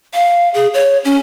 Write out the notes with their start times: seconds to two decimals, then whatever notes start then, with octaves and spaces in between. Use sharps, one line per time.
0.14 F5
0.54 G#4
0.74 C#5
1.05 C#4